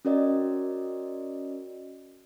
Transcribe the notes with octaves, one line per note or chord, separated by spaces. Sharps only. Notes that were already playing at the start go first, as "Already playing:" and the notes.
C#4 F#4 A#4 D5 D#5